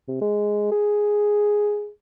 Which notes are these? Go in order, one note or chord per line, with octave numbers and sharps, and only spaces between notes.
C3
G#3
G#4